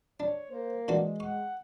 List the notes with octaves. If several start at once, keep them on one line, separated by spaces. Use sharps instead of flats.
D4 C#5
A#3 C5
E3 G#3 D4 F#4
F#5 C#6